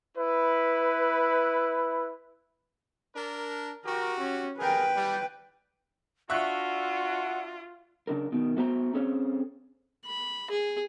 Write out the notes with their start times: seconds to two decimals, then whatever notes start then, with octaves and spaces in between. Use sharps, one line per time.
0.17 E4 B4
3.15 D4 A#4
3.85 F#4 G4 A#4
4.19 C#4
4.59 G3 G#4 A#4 B4 G5
4.95 G3
6.30 D4 F4 F#4 E5 F#5 C#6 F#6
8.07 C#3 D4 A#4
8.32 B2 D#3
8.56 A3 B3 F#4 C5 G#5 A#5
8.94 C4 C#4 G#4 A4 C5 C#5
10.06 B5
10.51 G#4